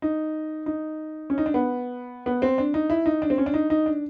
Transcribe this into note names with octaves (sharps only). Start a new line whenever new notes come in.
D#4
D#4
C#4
D#4
D4
B3
B3
C4
D4
D#4
E4
D#4
D4
C4
C#4
D4
D#4
D#4
D4